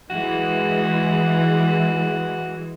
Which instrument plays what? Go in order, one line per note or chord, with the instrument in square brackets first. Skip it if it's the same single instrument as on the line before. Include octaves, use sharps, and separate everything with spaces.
[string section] E3 G#3 [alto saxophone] F#4